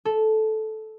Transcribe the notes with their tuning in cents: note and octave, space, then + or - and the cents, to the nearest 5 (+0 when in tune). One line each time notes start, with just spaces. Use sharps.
A4 -10